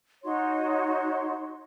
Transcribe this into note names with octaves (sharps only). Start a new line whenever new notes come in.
D#4 F#4 C#5 C6